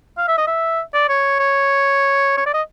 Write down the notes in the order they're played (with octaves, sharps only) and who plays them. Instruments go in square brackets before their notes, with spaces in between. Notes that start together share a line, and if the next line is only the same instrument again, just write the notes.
[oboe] F5
E5
D#5
E5
D5
C#5
C#5
C#5
D5
D#5